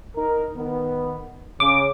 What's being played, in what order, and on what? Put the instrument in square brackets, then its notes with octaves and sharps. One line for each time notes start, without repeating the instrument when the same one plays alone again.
[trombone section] D#4 A#4
D#3 B3
[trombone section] C#3 [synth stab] D6